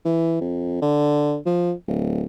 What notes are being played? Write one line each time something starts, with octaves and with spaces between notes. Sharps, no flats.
E3
F2
D3
F3
D1